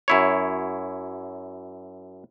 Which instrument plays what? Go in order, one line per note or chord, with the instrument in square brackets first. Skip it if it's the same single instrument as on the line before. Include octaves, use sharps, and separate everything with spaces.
[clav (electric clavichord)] F#2 E4 C#5